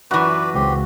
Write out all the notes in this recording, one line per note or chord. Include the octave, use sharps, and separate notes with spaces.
F#2 E3 F#4 B4 D5
C#2 C4 G4